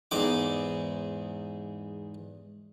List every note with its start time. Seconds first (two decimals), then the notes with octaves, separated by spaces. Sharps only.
0.11 E2 G#2 D#4 D6